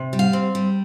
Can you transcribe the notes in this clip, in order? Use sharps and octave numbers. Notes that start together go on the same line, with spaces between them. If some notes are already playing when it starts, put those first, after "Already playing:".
Already playing: C3
G3
F5
C4
G3